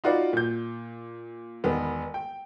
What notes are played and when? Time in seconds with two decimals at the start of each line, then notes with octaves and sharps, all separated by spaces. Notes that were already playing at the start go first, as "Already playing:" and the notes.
0.04 D#4 F4 F#4 B4 D5
0.33 A#2 G6
1.64 E1 D#3 B3
2.14 G5